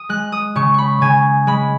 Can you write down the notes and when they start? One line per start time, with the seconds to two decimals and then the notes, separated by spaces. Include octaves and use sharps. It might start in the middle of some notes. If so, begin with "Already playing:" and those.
Already playing: D#6
0.09 G#3 F#6
0.32 D#6
0.56 C#3 C#6
0.74 B5 C#6
1.01 C#3 G#5
1.47 G#3 B5